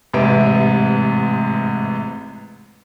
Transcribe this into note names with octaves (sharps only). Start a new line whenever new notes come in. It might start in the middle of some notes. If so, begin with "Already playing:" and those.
A1 G#2 C3 B4 E5 D7